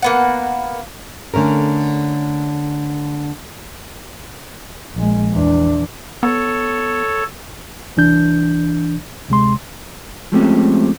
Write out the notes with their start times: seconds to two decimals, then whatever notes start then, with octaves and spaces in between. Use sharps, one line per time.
0.02 A#3 B3 F#5
1.34 D3 A3 C#4 A#4
4.93 A#1 G#3
5.32 E2 D4
6.23 B3 A4 C#5
7.97 C2 E3 D4 G6
9.29 D2 C3 G#3 C6
10.32 F3 G#3 A3 C4 C#4 G4